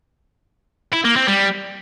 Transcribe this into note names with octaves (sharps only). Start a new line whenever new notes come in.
E4
A#3
C4
G3